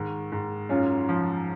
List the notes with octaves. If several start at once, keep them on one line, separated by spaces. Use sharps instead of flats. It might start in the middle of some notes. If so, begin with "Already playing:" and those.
Already playing: G#2 D#3
G#2
F#2 C#4 F4
F3